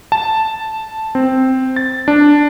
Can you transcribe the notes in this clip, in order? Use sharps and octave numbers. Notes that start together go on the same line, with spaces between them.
A5
C4
A6
D4